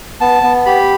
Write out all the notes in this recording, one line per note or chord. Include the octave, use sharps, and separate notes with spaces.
B3 A5
B3
G4 B5